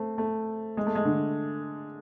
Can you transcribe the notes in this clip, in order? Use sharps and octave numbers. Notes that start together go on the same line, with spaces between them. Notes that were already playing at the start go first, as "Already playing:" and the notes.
Already playing: A3 C4
A3
G#3
A3
G#3
D3